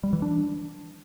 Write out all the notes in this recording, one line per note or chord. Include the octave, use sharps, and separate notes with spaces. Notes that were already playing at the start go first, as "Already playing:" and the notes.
G3
E3
D4